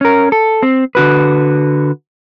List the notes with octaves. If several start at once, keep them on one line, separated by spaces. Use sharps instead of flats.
C#4 A#4
A4
C4
D3 F#4 B4